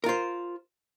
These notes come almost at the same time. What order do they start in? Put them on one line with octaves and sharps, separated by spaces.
A#4 F4 C5